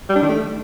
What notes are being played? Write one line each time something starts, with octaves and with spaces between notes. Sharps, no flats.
G3
D4
D#3
A3